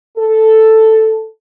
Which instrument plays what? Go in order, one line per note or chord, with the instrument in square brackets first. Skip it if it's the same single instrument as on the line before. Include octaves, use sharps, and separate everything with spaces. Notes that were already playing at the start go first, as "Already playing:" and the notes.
[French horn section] A4